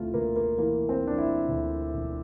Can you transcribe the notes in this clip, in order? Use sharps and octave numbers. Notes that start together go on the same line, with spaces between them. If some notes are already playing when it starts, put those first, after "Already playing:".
Already playing: E1 D2 C3 A3 E4 F4
D2 A#3
A#3
E3 A#3
C4
E3 D4
E4
D2
E1